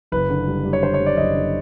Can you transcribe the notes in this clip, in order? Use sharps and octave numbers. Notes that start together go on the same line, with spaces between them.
F#1 B4
D3
G3
G3
C#5
D3 C5
C#5
G3
D5
F#1 D#5
D3